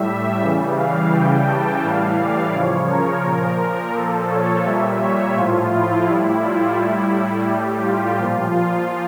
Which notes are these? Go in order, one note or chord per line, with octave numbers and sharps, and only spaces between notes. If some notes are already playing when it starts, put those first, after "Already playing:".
Already playing: A2 G3 E5
C#3 E3 G3
F5
C#3 E3 G3 G5
A5
A2 E3 G3 F5
D5
C#3 F3 C#5
A#4
A#2 F3
A#2 F3 A4
C#5
A#2 G3 E5
C#5
A2 F3 F4
E4
A2 G3 E4
F4
A2 G3 E4
A2 G3 G4
F4
A#2 F3 F4
F4